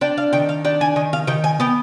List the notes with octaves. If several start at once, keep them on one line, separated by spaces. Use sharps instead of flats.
D4 G5
F5
D#3 G5
F5
D4 G5
G#5
D#3 G#5
F5
D#3 G5
G#5
B3 G5